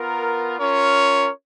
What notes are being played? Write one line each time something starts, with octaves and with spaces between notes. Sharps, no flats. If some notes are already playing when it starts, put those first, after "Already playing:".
Already playing: B3 F4 A#4
C#4 F4 A#4 C#5